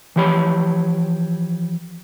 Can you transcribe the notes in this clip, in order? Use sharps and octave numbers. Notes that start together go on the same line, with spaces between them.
E3 F3 G4 C#5 B5